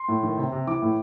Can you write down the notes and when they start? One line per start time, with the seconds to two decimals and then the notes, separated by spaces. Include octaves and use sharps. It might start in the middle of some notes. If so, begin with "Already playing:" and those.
Already playing: C6
0.08 A2
0.23 D#3
0.37 C3
0.52 C3
0.67 E3 D6
0.82 A2